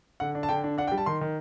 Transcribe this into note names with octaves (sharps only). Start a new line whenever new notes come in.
D3 F#5
D4
A5
D3 G5
D4
D4 F#5
G5
G3
A5
D#3 C6
D#3